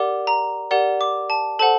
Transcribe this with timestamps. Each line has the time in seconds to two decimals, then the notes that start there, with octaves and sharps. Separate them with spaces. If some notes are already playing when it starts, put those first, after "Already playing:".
Already playing: G4 A#4 D5 F#5 D6
0.27 A#5
0.71 G4 A#4 D5 F#5
1.01 D6
1.30 A5
1.59 A4 C5 F#5 A5